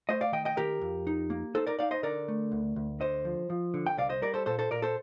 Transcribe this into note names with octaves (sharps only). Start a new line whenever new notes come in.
A3 C5 D#5
D5 F5
D#3 D#5 G5
D#5 G5
D#3 G4 A#4
F2
D#4
A#3
D#4 A4 C5
A#4 D5
D#4 D5 F5
C5 D#5
D3 A#4 D5
A3
D2
D2
D3 C5 D#5
F3
F3
D3
G5
C2 D5 F5
C5 D#5
G3 A#4 D5
A4 C5
A#2 A4 C5
A4 C5
A#2 A#4 D5
A4 C5